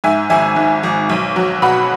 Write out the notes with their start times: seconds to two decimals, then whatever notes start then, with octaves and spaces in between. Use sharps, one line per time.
0.04 G#2 E5 G#5
0.30 G#1 E5 G#5
0.56 G#2
0.83 G#1
1.09 B1
1.36 F#3
1.62 B2 F#5 B5